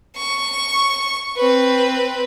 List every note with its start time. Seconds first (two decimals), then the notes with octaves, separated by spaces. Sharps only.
0.16 C#6
1.37 C4 B4